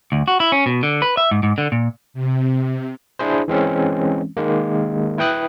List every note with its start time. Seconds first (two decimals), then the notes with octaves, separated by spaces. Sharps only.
0.12 D2
0.28 F#4
0.40 E4
0.52 C#4
0.66 B2
0.83 D3
1.02 B4
1.17 E5
1.31 G#2
1.43 G#2
1.58 D3
1.72 A#2
2.14 C3
3.19 D4 E4 G#4 C5
3.48 E3 G#3 C4 C#4
4.37 D#3 G#3 A#3
5.18 E4 B4 G5 D#6 F#6